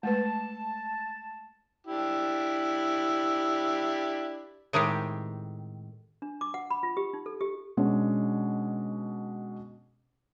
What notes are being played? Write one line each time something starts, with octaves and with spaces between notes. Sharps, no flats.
G#3 A3 B4 A5
D4 E4 G4
A2 D#3 G#3 C4 G4
D4
D6
F#5
B5
F4
G4
D#4
A4
G4
B2 G#3 C#4 D4